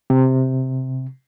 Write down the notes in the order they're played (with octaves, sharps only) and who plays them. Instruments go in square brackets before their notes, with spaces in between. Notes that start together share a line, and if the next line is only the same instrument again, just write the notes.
[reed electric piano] C3